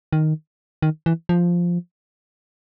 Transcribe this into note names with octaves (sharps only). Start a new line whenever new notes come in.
D#3
D#3
E3
F3